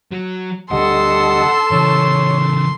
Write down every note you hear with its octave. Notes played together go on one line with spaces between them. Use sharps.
F#3 F#4
D2 G3 A4 D#5 F#5 C6
C#3 E3 C#5